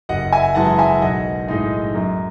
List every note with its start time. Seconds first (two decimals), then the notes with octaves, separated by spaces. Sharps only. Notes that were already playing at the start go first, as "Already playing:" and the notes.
0.09 F#1 D#5 F#5
0.33 E5 G#5
0.55 F#2 E3 G#3 F#5 A5
0.79 E5 G#5
1.02 B1 D#5 F#5
1.48 A2 G#3 D#4
1.94 F#2